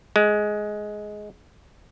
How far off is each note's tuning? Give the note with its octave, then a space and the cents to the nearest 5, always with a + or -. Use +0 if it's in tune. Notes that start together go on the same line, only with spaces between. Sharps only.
G#3 +10